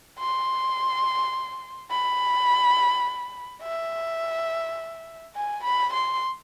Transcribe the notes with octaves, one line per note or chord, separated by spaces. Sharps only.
C6
B5
E5
G#5
B5
C6